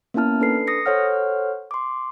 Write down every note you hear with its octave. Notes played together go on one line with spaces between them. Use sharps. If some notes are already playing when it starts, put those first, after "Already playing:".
A#3 B3 C#4 E4 A5 F6
D4 A4 B4 C7
D#6 A#6 C#7
A4 C5 C#5 F#5 F6
C6 D6